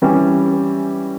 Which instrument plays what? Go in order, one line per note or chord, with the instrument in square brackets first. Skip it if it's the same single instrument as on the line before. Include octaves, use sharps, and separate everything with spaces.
[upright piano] E3 G3 C#4 G4